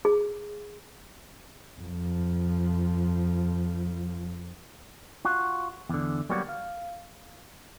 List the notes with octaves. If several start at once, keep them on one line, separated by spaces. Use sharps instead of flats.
G#4
F2 F3
F4 F#4
E2 D3
F#3 G3 A#3 B3 F#4 G4
F5